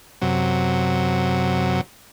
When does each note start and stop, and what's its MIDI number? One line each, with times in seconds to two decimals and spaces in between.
0.22 1.81 42
0.22 1.81 48
0.22 1.81 54